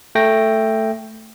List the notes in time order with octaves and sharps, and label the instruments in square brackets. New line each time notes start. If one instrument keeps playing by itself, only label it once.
[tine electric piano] A3 G5 A#6